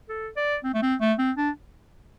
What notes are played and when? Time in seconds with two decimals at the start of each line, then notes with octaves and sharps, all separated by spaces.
0.09 A4
0.37 D5
0.64 C4
0.74 A3
0.82 C4
1.00 A3
1.19 C4
1.37 D4